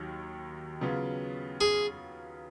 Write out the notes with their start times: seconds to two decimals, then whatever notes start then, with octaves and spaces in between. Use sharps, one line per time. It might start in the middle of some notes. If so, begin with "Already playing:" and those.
Already playing: D#2 D#3 F#3
0.81 C#3 F#3 B3 F4
1.61 G#4